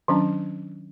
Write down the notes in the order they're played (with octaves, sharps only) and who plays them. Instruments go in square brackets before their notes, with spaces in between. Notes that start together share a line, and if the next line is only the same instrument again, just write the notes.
[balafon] D#3 F#3 C#4 D4